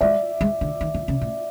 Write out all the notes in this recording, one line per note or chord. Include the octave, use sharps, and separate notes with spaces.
G#3 D5 E5
G#3
D3
D#3
D3
C#3
A2